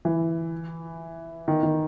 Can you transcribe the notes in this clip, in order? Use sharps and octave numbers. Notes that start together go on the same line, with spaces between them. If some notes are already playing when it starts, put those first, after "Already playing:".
E3
D#3
D#3